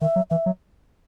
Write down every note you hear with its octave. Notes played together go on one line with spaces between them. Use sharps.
D#3 E5
F#3
E3 E5
F#3